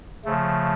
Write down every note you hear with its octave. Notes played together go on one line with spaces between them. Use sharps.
C#3 F3 A3